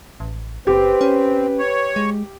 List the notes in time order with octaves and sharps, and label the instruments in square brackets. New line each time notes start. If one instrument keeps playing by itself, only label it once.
[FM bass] A1
[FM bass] F#1 [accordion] C4 [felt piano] G4 [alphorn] B4
[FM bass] C#4
[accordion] C#5
[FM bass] G#3